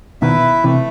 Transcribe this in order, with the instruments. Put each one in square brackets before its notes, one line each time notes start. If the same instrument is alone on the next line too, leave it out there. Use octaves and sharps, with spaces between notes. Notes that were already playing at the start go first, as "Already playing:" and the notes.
[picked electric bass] B2 D#3 [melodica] E4 B4 E5
[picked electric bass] C3 E3 [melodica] A3